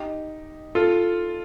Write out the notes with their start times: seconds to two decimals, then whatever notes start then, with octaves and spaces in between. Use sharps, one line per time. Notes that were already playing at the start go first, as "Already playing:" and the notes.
Already playing: D#4 G4
0.75 F4 A4